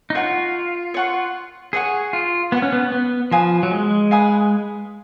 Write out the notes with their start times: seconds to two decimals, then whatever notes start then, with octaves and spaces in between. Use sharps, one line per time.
0.10 D#4
0.15 F4 C#5 F#5 C#6
0.94 C#5 F#5 C#6
1.73 G#4 C#5 F#5 C#6
2.13 F4
2.52 B3 C#5 F#5 C#6
2.62 C#4
2.73 B3
2.92 B3
3.31 F3 B4 F5 G#5 D#6
3.63 F#3
3.71 G#3
4.11 B4 F5 G#5 D#6